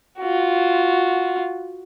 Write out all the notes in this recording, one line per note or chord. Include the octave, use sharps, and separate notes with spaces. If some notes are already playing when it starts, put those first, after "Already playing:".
F4 F#4